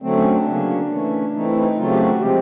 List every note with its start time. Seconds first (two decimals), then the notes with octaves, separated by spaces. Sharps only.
0.02 D3 F#3 A3 C4
0.17 C#4
0.31 D4
0.45 C#3 F#3 A#3 C#4
0.90 E3 A3 C#4
1.33 E3 A3 C4 D#4
1.45 E4
1.56 D#4
1.76 C#3 F#3 A3 C4 F4
1.91 G4
1.99 F#4
2.20 C3 F3 G#3 C4 G4